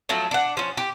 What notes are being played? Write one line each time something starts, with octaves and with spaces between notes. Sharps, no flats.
A2 F3 F#3 A3
D4 F#5
F3 C#4
G4